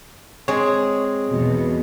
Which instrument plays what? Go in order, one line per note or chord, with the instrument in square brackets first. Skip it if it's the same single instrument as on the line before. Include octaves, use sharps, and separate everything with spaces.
[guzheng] G#3 C4 G#4 [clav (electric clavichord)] C#5
[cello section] E2 B2